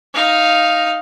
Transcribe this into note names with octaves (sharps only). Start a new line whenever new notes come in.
D#4 F5